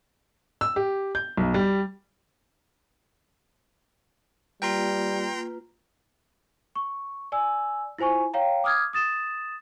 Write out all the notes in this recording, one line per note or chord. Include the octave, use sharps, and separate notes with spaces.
E6
G4
G6
B1
G3
G3 A#3 F4 B4 G5 A#5 C6
C#6
D5 G#5 E6
E4 F4 C5 G#5 C#6
C#5 F5 G5 A#5
D6 D#6 F6 G#6
D#6 A6 E7